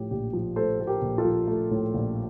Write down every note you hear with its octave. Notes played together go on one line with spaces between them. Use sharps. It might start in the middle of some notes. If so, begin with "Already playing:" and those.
Already playing: A2 F3 A3 G4
A#1 G4
F3
A3 A4 C5
A2 A4
G4 A#4
A#1
F4 A4
F3
A3
A2
A#1